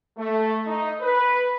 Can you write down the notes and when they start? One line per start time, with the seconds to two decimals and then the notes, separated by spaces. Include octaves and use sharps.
0.18 A3
0.66 D#4
1.01 B4